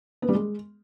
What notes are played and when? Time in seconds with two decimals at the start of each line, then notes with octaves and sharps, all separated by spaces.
0.22 B3
0.29 G3
0.35 G#3